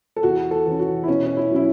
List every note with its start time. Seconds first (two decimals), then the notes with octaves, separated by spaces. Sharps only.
0.16 A4
0.23 E2 F#4
0.51 A4
0.66 E3 C#4
0.79 F#4
1.03 E4
1.08 B2 C#4
1.26 C#4
1.37 E4
1.51 F#3 C#4 E4